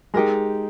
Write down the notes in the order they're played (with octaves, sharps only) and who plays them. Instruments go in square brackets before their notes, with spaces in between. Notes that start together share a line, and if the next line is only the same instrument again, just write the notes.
[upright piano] G#3 [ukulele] D#4 G4 A#4